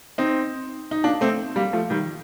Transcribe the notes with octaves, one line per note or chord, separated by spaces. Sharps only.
C4 D#4
D#4
A#3 D4
A3 C4
G3 A#3
F3 A3
D#3 G3